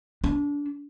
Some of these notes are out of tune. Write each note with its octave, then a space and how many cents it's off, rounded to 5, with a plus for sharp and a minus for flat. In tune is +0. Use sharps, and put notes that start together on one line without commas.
D4 -25